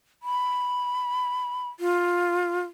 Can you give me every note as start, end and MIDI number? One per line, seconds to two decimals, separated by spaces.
0.23 1.69 83
1.80 2.60 65